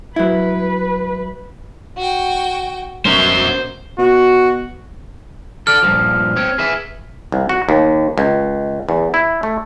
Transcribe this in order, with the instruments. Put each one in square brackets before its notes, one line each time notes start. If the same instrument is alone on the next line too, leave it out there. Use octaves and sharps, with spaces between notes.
[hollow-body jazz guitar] F#3 E4 [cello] B4
[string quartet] F#4 G5
[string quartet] B2 [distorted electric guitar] C#4 A#4 [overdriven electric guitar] C5
[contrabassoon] B2 [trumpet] F#4
[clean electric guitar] A4 D5 [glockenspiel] F6
[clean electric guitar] G2 A#2 F3
C4 C#5
G#4 B4 E5
[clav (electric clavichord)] C2
F#4
D#2
C#2
E2
E4
A3